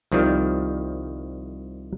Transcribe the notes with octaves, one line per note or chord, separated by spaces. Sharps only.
C2 D#3 F3 G3